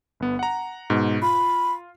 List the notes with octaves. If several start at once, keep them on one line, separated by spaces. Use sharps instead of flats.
G1 B3
F#5 A#5
G#2 B2
F4 B5